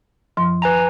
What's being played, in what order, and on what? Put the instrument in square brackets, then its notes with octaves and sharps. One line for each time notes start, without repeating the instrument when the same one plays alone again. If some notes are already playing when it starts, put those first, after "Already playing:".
[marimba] F#2 F3 C6
[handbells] B4 G#5 A#5